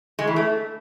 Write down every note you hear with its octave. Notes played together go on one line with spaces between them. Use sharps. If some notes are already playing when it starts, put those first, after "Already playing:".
G#3
E3
A3